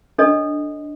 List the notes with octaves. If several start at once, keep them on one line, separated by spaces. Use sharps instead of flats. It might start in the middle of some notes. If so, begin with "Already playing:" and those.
D4 A4 C#5 D#5